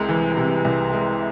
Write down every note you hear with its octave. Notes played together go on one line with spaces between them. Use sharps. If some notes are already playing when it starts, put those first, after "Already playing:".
Already playing: C2 C3 G#3
E3
C3
C2
G#3